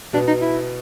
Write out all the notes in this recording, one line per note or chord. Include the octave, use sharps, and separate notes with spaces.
B2 B3 D4
D#4
E4